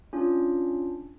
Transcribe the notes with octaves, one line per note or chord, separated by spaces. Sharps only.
C#4 D4 F4